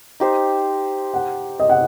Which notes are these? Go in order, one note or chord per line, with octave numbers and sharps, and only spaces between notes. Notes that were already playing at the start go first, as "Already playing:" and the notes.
D#4 G4 C5
F#5
D#5
F#5